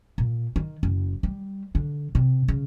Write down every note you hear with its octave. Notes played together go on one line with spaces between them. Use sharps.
A#2
D#3
F#1
G3
D3
C3
C#3